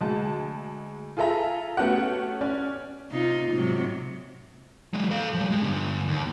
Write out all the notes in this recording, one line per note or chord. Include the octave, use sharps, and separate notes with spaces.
D2 G#3 A5
F4 G#4 A4 E5 A#5
A3 B3 C#4 F#4 G4 F#5
C#4 D5
C3 D#4 F4
G#2 C3 F#3
F#3 G#3
A4 F5
F3 G3
G#3 G4
G2 D3
D#2